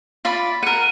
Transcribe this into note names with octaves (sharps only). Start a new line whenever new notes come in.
F4 D5 B5
A#4 F#5 D#7